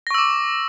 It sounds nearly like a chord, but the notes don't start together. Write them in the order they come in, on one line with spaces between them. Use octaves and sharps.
A#6 C#6 E6 D6